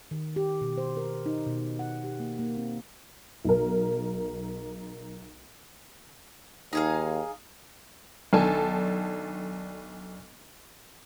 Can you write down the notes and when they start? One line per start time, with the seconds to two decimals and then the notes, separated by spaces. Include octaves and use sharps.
0.11 D#3
0.36 G4
0.61 B2
0.78 C5
0.97 A#4
1.26 D#4
1.46 B2
1.79 F#5
2.04 G4
2.20 A#3
2.39 A#3
2.57 C4
3.44 B1 A#4
6.73 D#2 D#4 G#4 F5
8.33 B1 D#3 D4 A4 G#5 A5